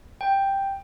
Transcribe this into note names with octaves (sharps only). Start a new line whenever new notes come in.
G5